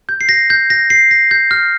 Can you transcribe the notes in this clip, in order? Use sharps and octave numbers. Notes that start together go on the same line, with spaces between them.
G6
C7
A#6
G6
A#6
C7
A#6
G6
F6